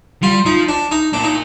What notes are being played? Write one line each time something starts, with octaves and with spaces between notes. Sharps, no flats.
G3 F4
F3 D#4
D4
D#4
A#2 D4
D#4